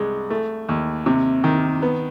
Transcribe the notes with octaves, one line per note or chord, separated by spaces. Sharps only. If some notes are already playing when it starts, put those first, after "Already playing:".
Already playing: C2 G#3
A3
D#2
C3
D#3
B3